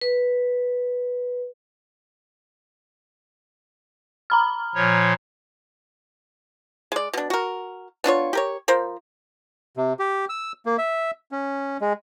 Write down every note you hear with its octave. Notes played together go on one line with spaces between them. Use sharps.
B4
A#5 B5 F6
A#2 F3 C#5
G#3 D5
B2 D4
F#4 A#4
B3 D4 F4 C#5
G4 A#4 C#5
F3 A#4 C5
C3
G4
E6
A#3
E5
C#4
G#3